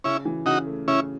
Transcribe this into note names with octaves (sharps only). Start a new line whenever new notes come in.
C#3 C#4 E4
E3
C#3 D#4 F#4
A3
C#3 C#4 E4